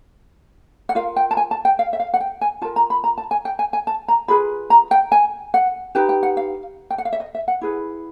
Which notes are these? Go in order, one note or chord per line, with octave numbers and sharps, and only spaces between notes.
F#5
F4 A#4 F5
G5
A5
G#5
A5
G5
F5
E5
F5
F#5
G5
G#5
F4 A#4 A5
A#5
B5
A#5
A5
G#5
G5
G#5
G#5
A5
A#5
F4 G#4 B4 B5
A#5
G5
G#5
F#5
D#4 G4 B4 G5
G5
F#5
F5
G5
F#5
F5
E5
D#5
E5
F#5
E4 G#4 B4